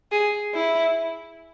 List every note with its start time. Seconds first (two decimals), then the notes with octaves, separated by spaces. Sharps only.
0.11 G#4
0.54 E4